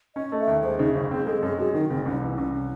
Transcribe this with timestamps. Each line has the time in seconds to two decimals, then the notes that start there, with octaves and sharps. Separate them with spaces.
0.16 C#4 D#5
0.32 A3
0.40 E5
0.47 D#2
0.63 G#3 C5
0.79 C#3 D#4
0.95 F#1 C#4
1.11 C4 G#4
1.26 G#3 A4
1.43 F#2 G#4
1.59 G#3 F#4
1.74 D#3 D#4
1.90 F#1 C4
2.06 C2 C#4
2.22 E3
2.38 C2 C#4
2.53 C#4